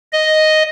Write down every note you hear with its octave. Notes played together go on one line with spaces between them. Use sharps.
D#5